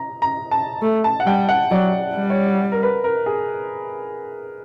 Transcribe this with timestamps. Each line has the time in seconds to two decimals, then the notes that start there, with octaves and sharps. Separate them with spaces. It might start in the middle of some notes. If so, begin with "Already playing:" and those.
Already playing: A#5
0.22 A#5
0.51 A5
0.82 A3
1.04 A5
1.20 F#5
1.26 G3 G5
1.49 F#5
1.71 F#3 D5
2.15 G3
2.30 C#5
2.72 A#4
2.83 B4
3.04 A#4
3.26 G#4